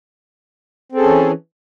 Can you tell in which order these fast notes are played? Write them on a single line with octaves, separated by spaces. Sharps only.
C4 A4 G#4 C#4 E3